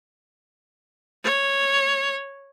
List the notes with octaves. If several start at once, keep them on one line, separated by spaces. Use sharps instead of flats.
C#5